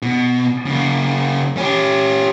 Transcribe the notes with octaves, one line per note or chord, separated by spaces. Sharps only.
B2
C#3 A#3
C#4 G4